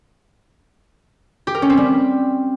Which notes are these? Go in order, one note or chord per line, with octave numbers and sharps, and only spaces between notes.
G4
A#4
C#4
C4
G3